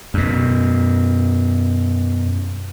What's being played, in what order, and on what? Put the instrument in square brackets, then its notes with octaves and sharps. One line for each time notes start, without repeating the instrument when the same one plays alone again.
[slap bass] F#2 B2